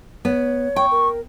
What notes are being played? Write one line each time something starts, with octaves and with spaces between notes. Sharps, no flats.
B3 C#5
G5 C#6
A#4